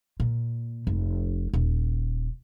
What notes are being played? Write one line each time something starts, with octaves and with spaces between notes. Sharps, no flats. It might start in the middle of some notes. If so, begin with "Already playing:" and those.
A#2
F1
D#1